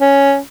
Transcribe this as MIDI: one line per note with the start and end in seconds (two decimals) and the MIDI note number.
0.01 0.38 61